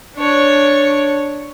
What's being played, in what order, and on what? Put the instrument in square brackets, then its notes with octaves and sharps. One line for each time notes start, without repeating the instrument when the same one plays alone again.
[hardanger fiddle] D4 C#5